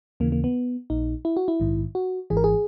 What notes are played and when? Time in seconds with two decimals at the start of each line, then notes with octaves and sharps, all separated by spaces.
0.20 D#2 C#3 E3 A#3
0.32 A#3
0.44 B3
0.90 A#1 A#2 D#4
1.25 E4
1.37 F#4
1.48 E4
1.60 A#1 G#2 D#3
1.95 F#4
2.30 G#1 G#2 E3 G#4
2.37 A#4
2.44 G#4